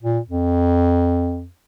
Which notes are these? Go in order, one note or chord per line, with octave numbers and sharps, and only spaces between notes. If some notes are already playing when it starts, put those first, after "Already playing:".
A#2
F2